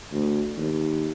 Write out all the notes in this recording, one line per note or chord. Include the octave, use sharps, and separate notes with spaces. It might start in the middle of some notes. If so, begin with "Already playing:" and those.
D2
D#2